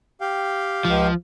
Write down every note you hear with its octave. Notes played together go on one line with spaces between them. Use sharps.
G4 F5 G5
C#2 F3